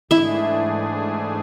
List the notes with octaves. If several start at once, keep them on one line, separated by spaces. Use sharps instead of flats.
G#2 E3 A3 D4 E4 G#4 E5